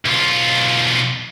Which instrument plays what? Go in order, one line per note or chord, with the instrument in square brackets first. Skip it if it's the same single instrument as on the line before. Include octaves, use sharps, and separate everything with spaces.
[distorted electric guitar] B1 F4